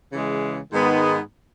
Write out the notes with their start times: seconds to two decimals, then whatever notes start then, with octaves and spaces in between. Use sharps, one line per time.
0.12 C#3 E3 G#3
0.72 G#2 D#3 G#3 B3